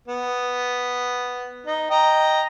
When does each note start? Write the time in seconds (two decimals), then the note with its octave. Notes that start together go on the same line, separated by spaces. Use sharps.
0.08 B3
1.66 D#4
1.90 D#5 G5 A#5